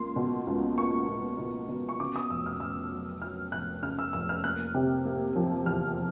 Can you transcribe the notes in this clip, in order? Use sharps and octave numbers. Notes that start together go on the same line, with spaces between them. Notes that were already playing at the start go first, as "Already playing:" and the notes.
Already playing: C#2 A#3 C6
B2
C#2
A#3 C#6
C#2
B2
B2
C#6
C#3 D6
D#6
F1 E6
F6
F1 E6
F#3
F#3 F6
F1 F#6
C#3 F6
E6
F1 E6
F6
A#3 F#6
C3
A#3
F3
E2 F6